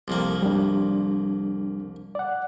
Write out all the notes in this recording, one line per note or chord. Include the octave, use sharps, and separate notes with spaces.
C2 F2 A#3
G3 D4
D5 F#5